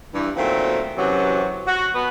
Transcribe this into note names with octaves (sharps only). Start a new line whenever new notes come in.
G2 E3
A#2 D#3 F#3 A3 C4
F#2 C3 E3 F#3
F#4
B2 B3